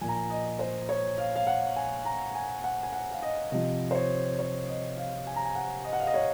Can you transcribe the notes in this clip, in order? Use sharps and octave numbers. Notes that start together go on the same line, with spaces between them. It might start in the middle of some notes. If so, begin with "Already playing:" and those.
A#2 F3 G#5
A#5
G#5
D#5
C5
C#5
F5
F5
F#5
G#5
A#5
G#5
F#5
G#5
F#5
F5
D#5
C3 F3 D#5
C5
C#5
C#5
D#5
F5
G#5
A#5
G#5
F#5
D#5
F#5
F5
D#5
C#5